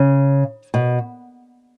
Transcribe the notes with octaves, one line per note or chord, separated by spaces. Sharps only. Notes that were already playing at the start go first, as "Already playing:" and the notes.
Already playing: C#3
B2